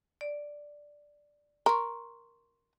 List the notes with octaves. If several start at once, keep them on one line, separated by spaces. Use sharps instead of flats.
D5
A#4 C6 C#6